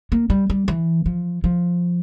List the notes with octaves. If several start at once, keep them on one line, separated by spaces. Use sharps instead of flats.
A#3
G3
G3
E3
F3
F3